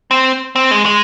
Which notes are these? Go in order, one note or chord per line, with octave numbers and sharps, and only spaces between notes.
C4
C4
G#3
G#3